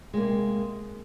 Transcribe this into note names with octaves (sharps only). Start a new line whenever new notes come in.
C3 G#3 A#3